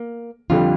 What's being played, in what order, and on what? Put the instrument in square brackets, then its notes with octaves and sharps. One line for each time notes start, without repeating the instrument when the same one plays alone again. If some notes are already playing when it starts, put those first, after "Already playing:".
Already playing: [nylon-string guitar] A#3
[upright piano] F2 D3 G3 [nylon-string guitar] F4